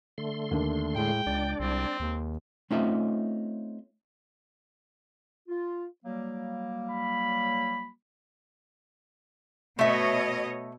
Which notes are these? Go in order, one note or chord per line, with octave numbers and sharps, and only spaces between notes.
D3 A3 C6
D#2 D4
A2 G#3 G5
C#2 D4 D5
C2 C4
D#2
A3 C4 C#4 D#4 F4 E5
F4
F#3 G3 A#3
B5
B2 A3 C#5 D#5 E5